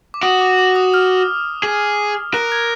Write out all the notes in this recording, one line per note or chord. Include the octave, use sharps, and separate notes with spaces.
D6
F#4 D#6
D6
D6
D#6
F6
G#4
A#4 F#6
G#6